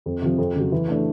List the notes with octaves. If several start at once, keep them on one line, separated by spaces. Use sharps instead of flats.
F2
C3 F3
F2
C#3 F#3
E3
A3 D4